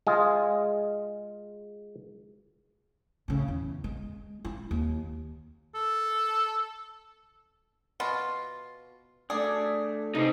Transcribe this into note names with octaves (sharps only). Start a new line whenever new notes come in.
G#3 F4 G#4
A2 C#3
E2
G#3
E4
D#2
A4
B2 F4
D3 A3 G#4 A4 D5
C3 D#4 C5